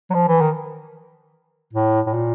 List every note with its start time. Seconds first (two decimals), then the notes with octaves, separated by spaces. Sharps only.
0.10 F#3
0.14 F3
0.28 E3
0.41 D#3
1.73 A2
2.06 A2
2.13 A#2